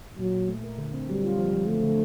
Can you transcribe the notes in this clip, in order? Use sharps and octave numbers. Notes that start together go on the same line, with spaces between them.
A#2 F#3
A#2
A3
A#4
D3
C4
F#3 G3
F4
F3
F3
D3 A3
D3